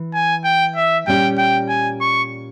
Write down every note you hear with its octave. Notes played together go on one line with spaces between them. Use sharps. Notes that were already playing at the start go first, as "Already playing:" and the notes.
Already playing: E3
G#5
G5
E5
A#2 G3 C#4 G4 G5
G5
G#5
C#6